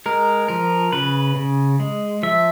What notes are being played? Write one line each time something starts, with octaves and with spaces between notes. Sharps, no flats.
G#3 A#4
F3 A#4
C#3 B4
C#3
G#3
F3 E5